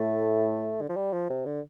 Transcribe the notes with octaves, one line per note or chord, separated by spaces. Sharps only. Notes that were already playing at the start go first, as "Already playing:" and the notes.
Already playing: A2 A3
D3
F3
G3
F3
C3
D3